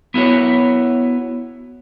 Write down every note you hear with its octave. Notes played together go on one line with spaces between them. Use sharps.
B3 E4 F#4 C#5